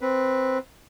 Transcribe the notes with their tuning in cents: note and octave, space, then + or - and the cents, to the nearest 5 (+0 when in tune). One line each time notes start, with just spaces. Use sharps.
C4 +0 B4 +0